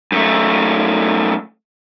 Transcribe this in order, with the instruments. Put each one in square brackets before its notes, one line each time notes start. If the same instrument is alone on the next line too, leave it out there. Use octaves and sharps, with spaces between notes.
[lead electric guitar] F#2 A3